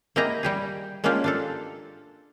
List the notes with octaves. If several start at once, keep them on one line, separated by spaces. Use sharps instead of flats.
A#3 E4 G4 G#4 D#5 A#5
G3 G4 G#4
G#3 A#3 C#4 D4 F4 G4
D4 F4 A4